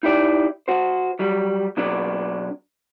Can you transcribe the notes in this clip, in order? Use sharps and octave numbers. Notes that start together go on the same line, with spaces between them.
D#4 E4 G4 D5
F#4 C5
F#3 G3
B2 F#3 D4